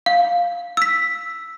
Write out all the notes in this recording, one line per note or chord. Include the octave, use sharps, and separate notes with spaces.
F5
E6 B6